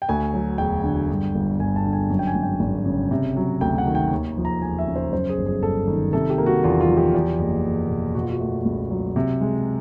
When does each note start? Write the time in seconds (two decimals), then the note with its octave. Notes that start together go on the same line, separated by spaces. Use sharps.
0.02 G5
0.09 D2 G#5
0.33 F#3
0.58 E1 G5
0.83 D3
1.09 G2
1.35 G1
1.59 G1 G#5
1.76 A5
1.85 D3
1.93 G#5
2.10 F#2
2.19 G5
2.27 G#5
2.35 G#1
2.43 G5
2.60 G#1
2.86 C#3
3.11 C3
3.36 F#3
3.61 D2 G5
3.78 F#5
3.87 D#3
3.95 G5
4.12 D#2
4.37 F3
4.45 A#5
4.62 E1 G#5
4.79 E5
4.87 C#3
4.96 C5
5.13 F#2 C5
5.29 G#4
5.38 G1
5.46 G#4
5.62 G1 A4
5.88 D#3
6.13 C3 A4
6.30 G4
6.38 A#3
6.46 F#4
6.64 E2 F4
6.81 F4
6.89 F3
6.97 G4
7.14 E2
7.39 F#1
7.64 F#1
7.89 B2
8.15 B2 F#4
8.22 F4
8.30 F#4
8.40 A3
8.65 C#2
8.90 F#3
9.16 C3
9.41 G#3